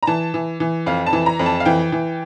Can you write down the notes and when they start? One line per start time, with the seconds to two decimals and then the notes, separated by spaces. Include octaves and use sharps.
0.03 A#5
0.07 E3 A5
0.34 E3
0.60 E3
0.86 F2 F5
1.06 A5
1.13 E3
1.26 A#5
1.39 F2
1.46 A5
1.60 F5
1.65 E3 G5
1.92 E3